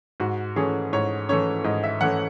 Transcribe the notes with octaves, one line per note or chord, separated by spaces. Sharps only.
G#2 F#4
E3 A3 C#4 G#4
G#2 C#5
E3 A3 C#4 C#5
G#2 D#5
E5
E3 A3 C#4 F#5